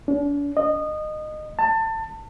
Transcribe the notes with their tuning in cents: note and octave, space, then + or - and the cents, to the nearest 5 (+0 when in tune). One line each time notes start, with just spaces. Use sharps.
D4 -45
D#5 -20
A5 +25